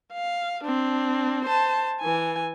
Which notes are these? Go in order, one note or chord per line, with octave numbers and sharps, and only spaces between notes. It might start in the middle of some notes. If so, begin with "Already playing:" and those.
F5
C4 D4
C5 A5
E3 G#5